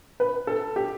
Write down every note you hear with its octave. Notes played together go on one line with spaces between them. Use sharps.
B4
A4
G4